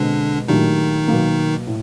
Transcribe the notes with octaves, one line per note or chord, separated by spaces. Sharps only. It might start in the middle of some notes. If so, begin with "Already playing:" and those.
Already playing: B2 D3 G#3 C4 D4
A#2 D#3 F#3 A3 D4 D#4 G4
B2 F#3 A#3
A2